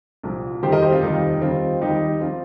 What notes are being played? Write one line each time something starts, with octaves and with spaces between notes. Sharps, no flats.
C2 A#2 F3
F1 D#2 D#3 G3 G4 C5
A#4 D#5
G4 C5
C4 F4
F1 D#2 D#3 G3 D#4
D#2 D#3 G3 C4 F4
D#2 D#3 G3 D#4 G4
F3 C4 F4